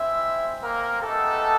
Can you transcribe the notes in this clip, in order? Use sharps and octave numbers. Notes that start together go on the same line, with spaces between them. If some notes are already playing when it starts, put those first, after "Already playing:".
Already playing: G#3 C4 E4 E5
A#3 A#4
G#3 A3 B3 D#4 G4 A4